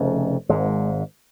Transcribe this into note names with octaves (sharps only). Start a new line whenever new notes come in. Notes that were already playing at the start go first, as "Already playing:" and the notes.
Already playing: F1 F2 C#3
G#1 G#2 G#3